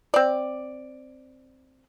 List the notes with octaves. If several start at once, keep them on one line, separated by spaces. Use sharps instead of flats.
C4 D5